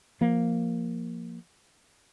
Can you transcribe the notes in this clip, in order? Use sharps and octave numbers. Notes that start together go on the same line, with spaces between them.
F3 A#3